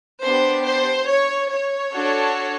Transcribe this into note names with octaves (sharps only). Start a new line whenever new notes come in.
B3 D4 G4 C5
C5
C#5
C#5
D4 F#4 A4